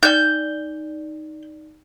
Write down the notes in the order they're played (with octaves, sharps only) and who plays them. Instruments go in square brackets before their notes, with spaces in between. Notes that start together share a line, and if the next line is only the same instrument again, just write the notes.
[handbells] D#4 D5 [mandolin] G6